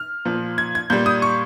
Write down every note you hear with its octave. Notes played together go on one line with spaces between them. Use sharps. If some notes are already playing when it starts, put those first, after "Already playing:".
Already playing: F6
A#2 F3
G#6
G#6
A#2 G3 G6
D#6
C#6